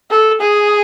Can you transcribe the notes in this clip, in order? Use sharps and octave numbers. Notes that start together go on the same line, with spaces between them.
A4
G#4